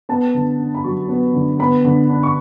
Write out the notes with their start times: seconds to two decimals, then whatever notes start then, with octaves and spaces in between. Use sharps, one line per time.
0.09 B3 A5
0.34 D3
0.59 D4
0.75 B5
0.84 F#3 C#6
1.09 B3
1.34 D3
1.59 B3 B5
1.85 D3
2.10 D4
2.23 C#6